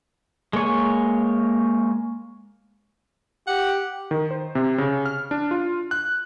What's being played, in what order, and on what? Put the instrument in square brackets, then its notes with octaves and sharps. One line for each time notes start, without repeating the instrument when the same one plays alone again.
[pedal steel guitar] G#3 A#3 C#5 G#5
[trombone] G4 [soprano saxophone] F#5
[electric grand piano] D#3
C5
C3
C#3
F6
D4
F4
F#6